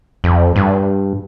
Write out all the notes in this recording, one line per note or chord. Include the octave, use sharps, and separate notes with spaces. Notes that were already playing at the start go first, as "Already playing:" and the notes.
F2
G2